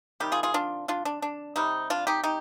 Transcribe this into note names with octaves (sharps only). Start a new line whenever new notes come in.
C3 D#3 G3 G4
F4 G#4
F4 G#4
D4 F4
D4 F4
D4
D4
C3 G3 C4 D#4
D4 F4
D#4 G4
D#4 G4